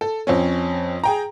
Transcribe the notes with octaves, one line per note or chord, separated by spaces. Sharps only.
A4
F2 C4 C#4
G#4 G5 A#5